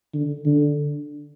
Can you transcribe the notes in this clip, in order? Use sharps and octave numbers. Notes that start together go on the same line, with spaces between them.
D3
D3